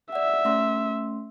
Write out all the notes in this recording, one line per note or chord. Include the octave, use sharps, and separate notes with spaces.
D5 E5 F#5
A3 C#4 C6